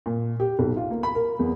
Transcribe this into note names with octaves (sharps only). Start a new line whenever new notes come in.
A#2
G4
B1
F4
A#3
B5
A#4
E2